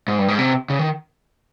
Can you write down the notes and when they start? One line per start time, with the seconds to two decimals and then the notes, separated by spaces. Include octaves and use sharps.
0.08 G#2
0.18 G2
0.28 G#2
0.39 C3
0.70 C#3
0.79 D#3